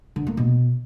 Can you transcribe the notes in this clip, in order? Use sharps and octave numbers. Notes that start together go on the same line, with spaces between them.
D3
A#3
B2